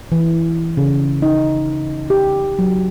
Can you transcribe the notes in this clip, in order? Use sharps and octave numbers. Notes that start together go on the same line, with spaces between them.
E3
C#3
D#4
G4
F#3